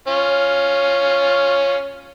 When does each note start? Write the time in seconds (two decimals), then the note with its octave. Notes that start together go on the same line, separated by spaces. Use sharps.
0.08 C#4 F4